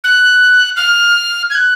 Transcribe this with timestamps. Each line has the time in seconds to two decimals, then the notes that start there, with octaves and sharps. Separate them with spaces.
0.04 F#6
0.77 F6
1.50 G#6
1.55 F#6